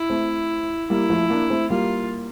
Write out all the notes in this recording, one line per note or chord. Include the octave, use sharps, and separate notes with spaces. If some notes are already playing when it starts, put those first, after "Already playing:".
Already playing: E4
A3 C4
G3 A#3 E4
F3 A3
A#3 D4
A3 C4
G3 A#3 F4